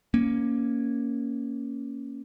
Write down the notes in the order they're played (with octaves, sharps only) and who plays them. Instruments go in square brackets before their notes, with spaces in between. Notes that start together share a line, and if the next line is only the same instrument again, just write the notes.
[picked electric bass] A#3 C#4